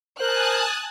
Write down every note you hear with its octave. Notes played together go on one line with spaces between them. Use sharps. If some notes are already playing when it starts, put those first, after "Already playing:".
A#4 C5 G#5 A5 D#6 F#6